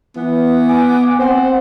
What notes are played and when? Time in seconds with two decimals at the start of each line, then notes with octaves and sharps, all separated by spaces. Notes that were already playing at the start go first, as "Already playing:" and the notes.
0.17 E3 B3
0.69 G#5 D6
1.19 C4 C5 F#5